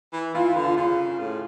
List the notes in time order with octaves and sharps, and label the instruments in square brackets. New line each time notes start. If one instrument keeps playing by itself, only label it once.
[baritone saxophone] E3
[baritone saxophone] E3 [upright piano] F4
[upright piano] F4
[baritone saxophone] D3
[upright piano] F4
[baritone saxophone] C#3 [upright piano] F4
[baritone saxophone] A2